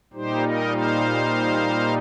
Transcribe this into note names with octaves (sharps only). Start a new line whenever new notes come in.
A#2 G3 D#4 G4 C5
A#4 D#5
C5 F5